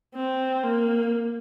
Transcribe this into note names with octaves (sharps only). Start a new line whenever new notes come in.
C4
A#3